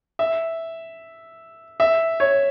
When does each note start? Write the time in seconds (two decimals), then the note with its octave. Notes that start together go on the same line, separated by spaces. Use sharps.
0.19 E5
1.80 E5
2.20 C#5